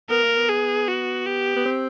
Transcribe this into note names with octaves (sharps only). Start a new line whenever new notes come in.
B3 A#4
A#3
B3
G#4
F#4
G4
B3
C4